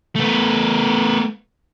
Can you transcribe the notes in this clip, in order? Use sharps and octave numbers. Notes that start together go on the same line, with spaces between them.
A3 B3